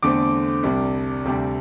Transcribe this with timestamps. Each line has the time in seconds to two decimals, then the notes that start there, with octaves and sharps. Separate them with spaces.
0.03 E2 D3 A3 C4 D6
0.63 C2 C3 G3 D4
1.25 D2 C3 G3 D4